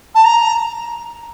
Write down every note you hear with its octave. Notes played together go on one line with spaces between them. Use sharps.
A5
A#5